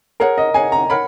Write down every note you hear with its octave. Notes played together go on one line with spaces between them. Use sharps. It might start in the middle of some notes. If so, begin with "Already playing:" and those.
G#4 A#4 C#5 F#5
D#5
G#4 C#5 F#5 G#5
A#5
A#4 C#5 F#5 B5